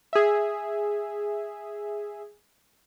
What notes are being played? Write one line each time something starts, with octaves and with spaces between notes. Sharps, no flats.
G#4 E5